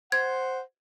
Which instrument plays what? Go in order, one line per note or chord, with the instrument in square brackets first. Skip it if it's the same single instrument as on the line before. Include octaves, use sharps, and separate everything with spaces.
[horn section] C5 F#5 [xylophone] G#6